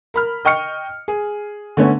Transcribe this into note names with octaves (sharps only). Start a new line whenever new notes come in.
A#4 B5 F6
D#5 G5 C#6 F6 C#7
G#4
D3 A3 B3 C#4